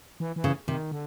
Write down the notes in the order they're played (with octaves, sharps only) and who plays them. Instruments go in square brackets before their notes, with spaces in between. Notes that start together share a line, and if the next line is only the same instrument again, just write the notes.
[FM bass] E3
E3
[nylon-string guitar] C#3
[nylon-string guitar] C3 [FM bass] D#3
[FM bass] D3